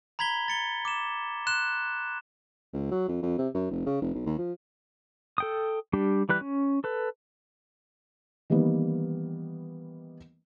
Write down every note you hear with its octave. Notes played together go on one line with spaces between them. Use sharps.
A#5 B5 G#6 B6 G7
A6 C#7 G7
D6 E7
C6 F#6 E7
C#2
F#3
F2
F2
C3
F#2
F1
C#3
F1
B1
D#2
F3
A4 G5 D#6
G3 D4 G4
E3 G3 B4 F#6
C#4
A4 B4
D#3 E3 G3 A#3 B3